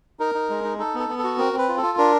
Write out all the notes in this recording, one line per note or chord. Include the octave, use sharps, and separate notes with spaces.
D#4 A#4
D#4
G#3
D#4
D#4 A4
B3 A4
B3
F#4 A4
C4 A#4
C4
B4
F4
A4
F4
D4 A#4